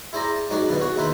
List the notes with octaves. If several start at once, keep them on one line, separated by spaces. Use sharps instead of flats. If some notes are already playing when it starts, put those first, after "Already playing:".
E4 G#4 C5 D5 A#5
A5
G#2 F#3 D#4 F#4 G#4 D5
B2 D3 E3 B3
F#4 G#4 C#5 F#5
D#2 D#4 E4 B4 C5 B5